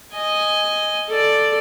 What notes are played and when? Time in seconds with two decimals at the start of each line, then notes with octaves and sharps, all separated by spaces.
0.14 D#5 G#5
1.09 A4 D5